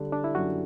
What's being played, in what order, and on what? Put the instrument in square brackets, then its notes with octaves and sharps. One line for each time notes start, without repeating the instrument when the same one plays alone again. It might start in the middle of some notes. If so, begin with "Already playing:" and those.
Already playing: [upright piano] D3 G3 [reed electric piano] A4
[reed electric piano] D4
E4
[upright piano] F#2 [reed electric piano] F#4